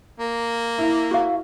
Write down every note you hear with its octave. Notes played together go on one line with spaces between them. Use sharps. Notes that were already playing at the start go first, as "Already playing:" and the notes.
A#3
E4
F#4 F5